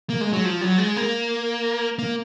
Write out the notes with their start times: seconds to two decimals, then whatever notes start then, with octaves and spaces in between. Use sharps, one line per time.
0.10 A#3
0.21 G#3
0.33 F#3
0.45 F3
0.61 F#3
0.78 G#3
0.96 A#3
1.99 A#3